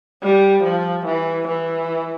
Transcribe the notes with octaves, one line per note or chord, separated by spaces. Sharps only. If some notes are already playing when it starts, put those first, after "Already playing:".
G3
F3
E3
E3